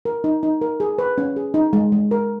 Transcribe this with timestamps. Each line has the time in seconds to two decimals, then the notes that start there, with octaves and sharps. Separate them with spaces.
0.05 A#4
0.24 D#4
0.43 D#4
0.61 A#4
0.80 G#4
0.98 B4
1.18 C#4
1.36 G#4
1.54 D#4
1.73 G#3
1.92 G#3
2.11 A#4